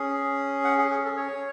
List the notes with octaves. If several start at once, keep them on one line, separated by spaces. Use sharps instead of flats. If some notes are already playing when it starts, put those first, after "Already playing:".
Already playing: C#4 G#4
F#5
G#4
G#4
A4
C#5